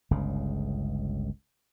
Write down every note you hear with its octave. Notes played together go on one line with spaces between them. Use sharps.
G1 C#2 C#3